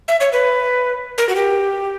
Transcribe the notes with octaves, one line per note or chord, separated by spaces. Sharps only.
E5
C#5
B4
A#4
F#4
G4